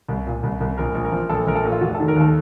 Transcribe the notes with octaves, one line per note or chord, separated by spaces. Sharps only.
C2
A#2
C2
C2
A#1 A#4
A#1
A#4
F3
A#1 A4
A#1 A#4
A4
A#2
F4
F1 F#4
A4
D#3
A#4
D#2 A4